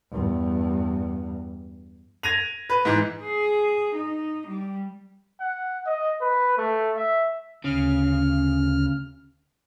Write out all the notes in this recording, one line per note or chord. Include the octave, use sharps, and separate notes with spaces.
E2 G2
G#6 A#6 D#7 F7
B4
G#2 E3
G#4
D#4
G3
F#5
D#5
B4
A3
E5
D2 C#3 F6